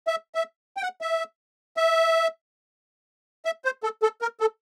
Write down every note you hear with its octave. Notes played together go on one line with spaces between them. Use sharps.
E5
E5
G5
F#5
E5
E5
E5
C5
A4
A4
A#4
A4